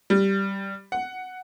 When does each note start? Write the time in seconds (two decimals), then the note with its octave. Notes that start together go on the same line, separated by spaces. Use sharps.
0.10 G3
0.92 F#5